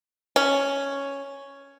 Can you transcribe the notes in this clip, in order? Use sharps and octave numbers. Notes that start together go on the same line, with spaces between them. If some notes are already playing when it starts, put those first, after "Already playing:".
C#4